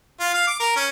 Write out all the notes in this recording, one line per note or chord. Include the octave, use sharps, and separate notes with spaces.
F4
F5
D6
A#4
C#4